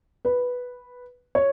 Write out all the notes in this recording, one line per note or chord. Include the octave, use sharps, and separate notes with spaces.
B4
C#5